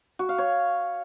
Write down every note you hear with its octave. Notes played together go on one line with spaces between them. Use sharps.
F#4
F5
C#5